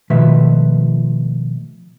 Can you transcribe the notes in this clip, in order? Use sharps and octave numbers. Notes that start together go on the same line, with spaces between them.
B2 D#3 F3 A3 B4 E5